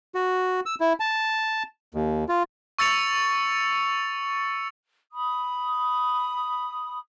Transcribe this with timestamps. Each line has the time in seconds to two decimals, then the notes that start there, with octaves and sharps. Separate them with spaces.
0.15 F#4
0.66 E6
0.80 E4
1.00 A5
1.95 D#2
2.29 F4
2.79 C#6 E6 A6 C#7 F7
5.13 B5 D#6